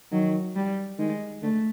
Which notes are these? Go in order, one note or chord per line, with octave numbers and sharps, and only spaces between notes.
D#3 F#3
G3
D#3 G#3
D3 A3